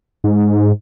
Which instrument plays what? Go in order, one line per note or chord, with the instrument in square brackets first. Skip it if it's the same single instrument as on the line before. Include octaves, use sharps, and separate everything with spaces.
[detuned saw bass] G#2